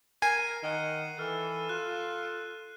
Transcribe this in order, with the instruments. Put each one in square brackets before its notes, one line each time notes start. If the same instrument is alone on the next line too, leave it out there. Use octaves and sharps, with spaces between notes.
[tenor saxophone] A#4 [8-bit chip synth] G#5 [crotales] C7 D#7
[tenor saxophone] D#3 [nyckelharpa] F#5
[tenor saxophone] E3 [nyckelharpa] A4 [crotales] F6
[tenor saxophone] F4 [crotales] F#6